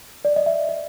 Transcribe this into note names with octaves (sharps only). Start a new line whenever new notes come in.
D5
D#5
E5
D#5